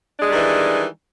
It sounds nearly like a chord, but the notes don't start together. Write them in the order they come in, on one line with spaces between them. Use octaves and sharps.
D4 G#3 G3 D#3 E3